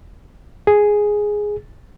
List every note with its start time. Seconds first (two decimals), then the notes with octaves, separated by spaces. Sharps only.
0.67 G#4